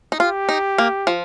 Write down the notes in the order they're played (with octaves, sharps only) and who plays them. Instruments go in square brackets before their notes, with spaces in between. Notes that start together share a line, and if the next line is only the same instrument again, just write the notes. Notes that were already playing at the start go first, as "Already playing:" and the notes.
[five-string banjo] D#4
[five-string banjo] F4 [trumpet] G4
[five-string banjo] D#4
A#3
F3